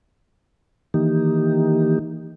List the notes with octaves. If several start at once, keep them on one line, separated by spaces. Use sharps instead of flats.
D#3 E3 A#3 D#4 G4